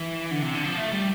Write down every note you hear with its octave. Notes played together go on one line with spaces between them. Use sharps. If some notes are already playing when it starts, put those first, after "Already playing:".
Already playing: E3
D3
C3
D3
F3
A3
G3